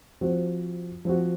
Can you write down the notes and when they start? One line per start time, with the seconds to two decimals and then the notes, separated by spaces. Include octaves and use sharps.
0.21 F3 C4 F#4
1.05 F3 C4 F#4